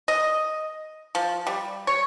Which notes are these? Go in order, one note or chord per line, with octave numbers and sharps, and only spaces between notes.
D#5
F3
G3
C#5